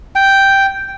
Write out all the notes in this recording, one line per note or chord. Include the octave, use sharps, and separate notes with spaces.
G5